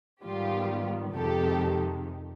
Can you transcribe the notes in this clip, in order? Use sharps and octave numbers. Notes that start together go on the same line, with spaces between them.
G#2 D#3 G3 B3 F4 G4
F2 C3 D#3 G#3 G4 A4